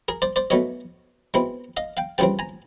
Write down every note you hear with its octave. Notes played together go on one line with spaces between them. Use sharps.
G#4 A#4
C5 D5
C5 D5
B1 B2 F#3 A3 C#5 D#5
B2 G#3 C4 E4
D#5 F5
F5 G5
C#2 C#3 E3 G3 C4 G5 A5
G#5 A#5